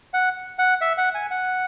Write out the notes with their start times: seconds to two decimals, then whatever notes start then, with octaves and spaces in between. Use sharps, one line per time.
0.14 F#5
0.59 F#5
0.81 E5
0.98 F#5
1.15 G#5
1.31 F#5